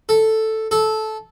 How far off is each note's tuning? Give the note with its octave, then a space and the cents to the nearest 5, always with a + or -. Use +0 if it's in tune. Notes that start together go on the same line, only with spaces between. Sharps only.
A4 +0
A4 -15